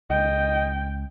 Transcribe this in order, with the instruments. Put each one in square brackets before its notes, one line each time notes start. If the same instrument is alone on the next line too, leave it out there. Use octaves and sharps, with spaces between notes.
[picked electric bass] C#2 [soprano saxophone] D#5 [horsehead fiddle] G5